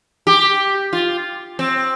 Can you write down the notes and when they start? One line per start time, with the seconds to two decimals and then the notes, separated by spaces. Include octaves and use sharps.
0.27 G4
0.93 F4
1.59 C4